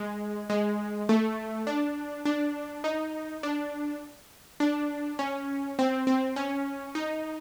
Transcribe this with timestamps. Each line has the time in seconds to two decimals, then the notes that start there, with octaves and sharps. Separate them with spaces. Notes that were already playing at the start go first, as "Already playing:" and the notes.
Already playing: G#3
0.50 G#3
1.09 A3
1.67 D4
2.25 D4
2.84 D#4
3.43 D4
4.60 D4
5.19 C#4
5.79 C4
6.07 C4
6.36 C#4
6.95 D#4